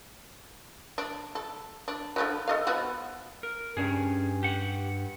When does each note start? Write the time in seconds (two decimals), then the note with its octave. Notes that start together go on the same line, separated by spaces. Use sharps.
0.98 D4
1.35 A4
1.88 D4
2.16 D3 F3 F#3
2.48 A4 D#5 F5
2.67 F3 B3 F#4
3.43 A#4
3.77 G2 C#4 G#4
4.43 G4 F#5